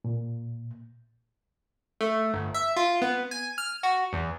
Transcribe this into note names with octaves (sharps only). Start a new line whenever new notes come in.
A#2
A3
G1
E5
F4
B3
G#5
F6
F#4
E2